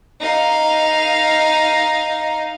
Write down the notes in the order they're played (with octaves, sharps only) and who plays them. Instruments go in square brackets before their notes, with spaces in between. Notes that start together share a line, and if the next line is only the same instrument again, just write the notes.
[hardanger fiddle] D#4 F5